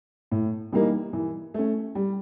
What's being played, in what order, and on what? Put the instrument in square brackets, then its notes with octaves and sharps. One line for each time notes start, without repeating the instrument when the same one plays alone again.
[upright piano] A2
E3 G3 A#3 D#4
E3
A3 C#4
G3